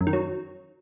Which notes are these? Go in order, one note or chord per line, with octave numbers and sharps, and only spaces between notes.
F#2
D#3
F#3